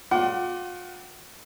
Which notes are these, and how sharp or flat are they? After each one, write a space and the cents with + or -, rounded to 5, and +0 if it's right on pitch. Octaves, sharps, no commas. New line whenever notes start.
F4 +40 F#5 +45 D6 +0